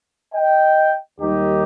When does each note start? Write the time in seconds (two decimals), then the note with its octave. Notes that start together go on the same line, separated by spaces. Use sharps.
0.33 D#5 G5
1.19 D#2 D#3 G3 D#4 G4